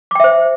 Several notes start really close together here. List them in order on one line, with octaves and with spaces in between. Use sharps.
D6 G5 E5 C5